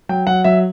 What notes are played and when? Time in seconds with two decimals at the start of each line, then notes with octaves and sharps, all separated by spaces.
0.09 F#3 G5
0.27 F#3 F#5
0.44 F#3 E5